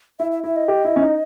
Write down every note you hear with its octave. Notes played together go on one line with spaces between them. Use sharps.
E4 E5
E5
E4 E5
D#5
G4
E4
C#4
D#4